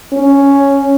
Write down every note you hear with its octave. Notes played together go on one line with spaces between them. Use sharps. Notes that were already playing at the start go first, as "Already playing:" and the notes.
C#4